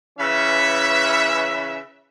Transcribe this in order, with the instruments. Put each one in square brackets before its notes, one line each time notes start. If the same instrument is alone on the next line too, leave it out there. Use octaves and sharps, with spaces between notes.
[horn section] C#3 E3 C#4 B4 E5